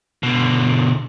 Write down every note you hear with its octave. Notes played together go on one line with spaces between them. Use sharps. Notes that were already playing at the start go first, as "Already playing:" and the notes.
B2 D3